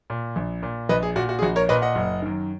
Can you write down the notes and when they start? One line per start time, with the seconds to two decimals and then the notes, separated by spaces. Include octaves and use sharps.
0.10 A#2
0.36 A#1
0.63 A#2
0.89 A#1 B4 D#5
1.03 G#4
1.16 A#2 F#4
1.29 F#4
1.39 G#4
1.42 A#1 F#4
1.56 A#4 C#5
1.69 A#2 B4 D#5
1.82 D#5 F#5
1.95 F#1
2.22 F#2 D#3